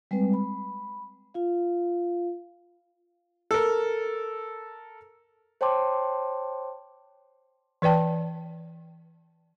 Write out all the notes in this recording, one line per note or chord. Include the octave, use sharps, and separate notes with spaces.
G3 G#3 C4 B4
B5
F4 F5
A4 A#4
C5 C#5 G5 A5 C6 D6
E3 B4 D5 G5 A5